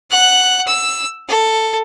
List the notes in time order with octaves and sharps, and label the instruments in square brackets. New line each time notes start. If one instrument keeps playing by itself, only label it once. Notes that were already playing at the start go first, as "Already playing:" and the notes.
[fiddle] F#5 F#6
E6
A4